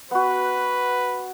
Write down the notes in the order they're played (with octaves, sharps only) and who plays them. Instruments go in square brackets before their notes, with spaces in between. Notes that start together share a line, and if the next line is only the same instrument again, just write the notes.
[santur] B3 F#4 [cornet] B4